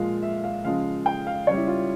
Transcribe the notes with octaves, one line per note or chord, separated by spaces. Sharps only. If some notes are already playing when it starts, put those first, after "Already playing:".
Already playing: A#2 F3 G#3 F5
E5
F5
C#3 F3 G#3 F5
G5
F5
C#3 G3 C#5
E4
F4